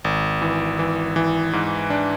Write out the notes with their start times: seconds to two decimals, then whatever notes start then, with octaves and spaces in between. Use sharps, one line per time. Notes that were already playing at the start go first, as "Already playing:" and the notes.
0.04 G#1
0.42 E3
0.79 E3
1.16 E3
1.53 G#2
1.90 D4